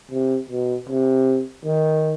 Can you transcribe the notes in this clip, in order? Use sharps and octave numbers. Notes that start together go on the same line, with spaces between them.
C3
B2
C3
D#3